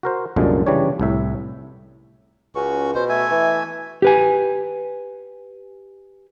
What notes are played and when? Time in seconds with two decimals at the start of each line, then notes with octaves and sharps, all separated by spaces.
0.03 F#4 A#4 C5
0.36 C2 F#2 A#2 D3 F3 G#3
0.66 C#3 E3 G3 D4 C#5
1.00 C2 A2 E5
2.55 C#2 C#4 F#4 C#6
2.95 B2 C5
3.09 A3 E5 G#5
3.31 E3
4.02 G4 B4 G#5